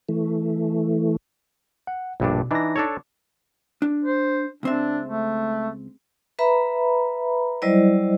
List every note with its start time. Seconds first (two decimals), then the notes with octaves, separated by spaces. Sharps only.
0.09 E3 A3
1.87 F#5
2.20 A#1 G2 B2 D4
2.51 E3 D4 D#4 A#6
2.76 D4 A4 C#5
3.82 D4
4.04 C5
4.63 C#2 C4 D4 E5
5.06 A3
6.39 B4 E5 A#5 B5
7.62 F#3 G3 E4 C5 D5 D#5